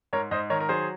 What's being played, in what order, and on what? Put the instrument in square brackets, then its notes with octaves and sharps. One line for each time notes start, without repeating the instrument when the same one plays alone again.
[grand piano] G#2 A#4 C#5
G#2 C5 D#5
D#3 A#4 C#5
A#4
F#3 G#4 C5